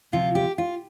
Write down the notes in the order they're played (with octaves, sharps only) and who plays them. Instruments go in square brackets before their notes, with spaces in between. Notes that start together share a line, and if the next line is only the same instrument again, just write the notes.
[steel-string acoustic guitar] D2 C3 F3 F4
G4
F4